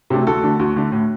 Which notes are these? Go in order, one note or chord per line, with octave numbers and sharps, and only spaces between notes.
C3 F#3 A3 D4
D2 F#4 A4
D3 A3 D4
D2 F#4
D3 A3 D4
A2